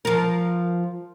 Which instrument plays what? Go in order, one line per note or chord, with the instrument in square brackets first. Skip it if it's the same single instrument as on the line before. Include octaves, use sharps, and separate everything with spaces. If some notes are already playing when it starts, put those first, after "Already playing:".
[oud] F3 A#4